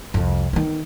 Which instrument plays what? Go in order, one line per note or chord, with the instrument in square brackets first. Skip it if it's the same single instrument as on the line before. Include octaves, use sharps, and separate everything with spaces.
[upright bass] C2 F2
D#3 B3